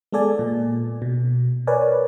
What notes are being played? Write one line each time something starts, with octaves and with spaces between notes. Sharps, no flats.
G#3 B3 A4 D5 G#5
A#2
B2
A#4 B4 C#5 D5 G#5